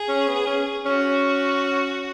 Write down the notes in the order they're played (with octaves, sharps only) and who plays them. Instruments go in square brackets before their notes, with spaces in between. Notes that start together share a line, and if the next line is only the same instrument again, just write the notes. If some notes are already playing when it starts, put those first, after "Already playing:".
Already playing: [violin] G#4
[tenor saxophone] C#4
B3
C#4
[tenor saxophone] C#4 [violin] F#4